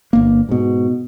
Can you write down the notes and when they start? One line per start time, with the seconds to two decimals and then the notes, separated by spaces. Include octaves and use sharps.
0.13 G1 A#3
0.49 G#2 B2